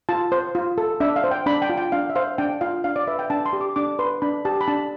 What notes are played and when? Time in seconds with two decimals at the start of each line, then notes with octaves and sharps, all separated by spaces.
0.09 F4 A5
0.32 C5
0.55 F4
0.78 A4
1.00 D4 E5
1.16 F5
1.24 C5
1.31 G5
1.46 D4 B5
1.62 G5
1.70 F4
1.78 G5
1.92 D4 F5
2.10 E5
2.16 C5 F5
2.38 D4 G5
2.61 F4 F5
2.84 D4 F5
2.96 D5
3.07 B4 E5
3.19 G5
3.30 D4 A5
3.46 C6
3.53 G4
3.61 D6
3.76 D4 D6
3.99 B4 C6
4.22 D4 B5
4.45 G4 A5
4.61 B5
4.68 D4 A5